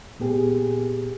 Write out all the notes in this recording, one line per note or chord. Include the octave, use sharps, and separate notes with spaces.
A#2 B3 G4 G#4